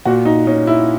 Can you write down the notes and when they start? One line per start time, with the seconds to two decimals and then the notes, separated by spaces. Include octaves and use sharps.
0.06 A#2 F#4
0.25 D#4
0.47 C#4 D#4
0.67 E4